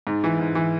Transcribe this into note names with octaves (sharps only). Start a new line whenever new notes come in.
G#2
E3
G#2
E3